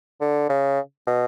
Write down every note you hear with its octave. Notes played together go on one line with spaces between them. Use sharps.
D3
C#3
B2